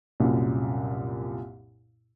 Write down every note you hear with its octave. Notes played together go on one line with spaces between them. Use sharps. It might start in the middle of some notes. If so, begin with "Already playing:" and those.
C2 F#2 A#2